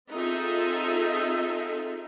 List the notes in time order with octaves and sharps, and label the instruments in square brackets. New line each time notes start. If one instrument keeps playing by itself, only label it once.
[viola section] C4 D#4 F4 G#4 A4 E5